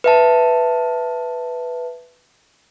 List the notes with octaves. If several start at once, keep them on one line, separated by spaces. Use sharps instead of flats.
B4 E5 A5